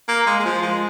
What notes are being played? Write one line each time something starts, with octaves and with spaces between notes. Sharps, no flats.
A#3
G#3
G#3
F3
G#3